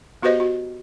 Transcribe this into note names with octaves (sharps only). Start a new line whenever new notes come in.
B3 F#4 G4 B4 C5 D#5
F#4